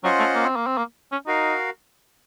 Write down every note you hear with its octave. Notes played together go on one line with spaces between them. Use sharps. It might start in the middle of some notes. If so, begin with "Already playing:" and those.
F#3 C#4 F4 C5 D#5 F#5
A3
A#3
C4
A#3
C4
A#3
C#4
D#4 F#4 A#4 F5